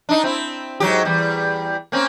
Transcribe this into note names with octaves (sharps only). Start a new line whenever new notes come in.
D4 D#4
C4 E4
G#2 F#3 G4
E2 G3
A#3 C4 C#4